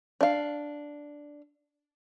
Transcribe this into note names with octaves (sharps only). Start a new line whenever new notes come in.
D4 F5